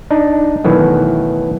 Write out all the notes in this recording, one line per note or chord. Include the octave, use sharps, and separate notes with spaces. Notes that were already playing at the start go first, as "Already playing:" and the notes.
D4 D#4
B2 D#3 E3 F#3 A3